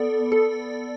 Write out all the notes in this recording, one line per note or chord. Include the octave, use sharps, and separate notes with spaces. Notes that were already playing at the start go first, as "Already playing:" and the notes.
Already playing: B3 A4 D5
A4